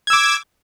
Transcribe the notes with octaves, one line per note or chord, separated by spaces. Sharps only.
D6 E6 G#6